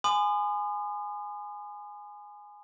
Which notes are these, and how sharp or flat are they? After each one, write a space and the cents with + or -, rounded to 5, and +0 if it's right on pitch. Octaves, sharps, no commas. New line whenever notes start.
G#5 +0 C6 -45 D#6 -40